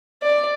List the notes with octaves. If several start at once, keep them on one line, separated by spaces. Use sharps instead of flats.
D5